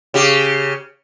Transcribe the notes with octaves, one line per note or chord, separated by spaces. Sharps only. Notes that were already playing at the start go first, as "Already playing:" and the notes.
C#3 G4